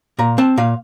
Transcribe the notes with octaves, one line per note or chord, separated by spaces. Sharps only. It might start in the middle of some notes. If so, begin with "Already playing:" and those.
A#2 A#5
C4 A5
A#2 F5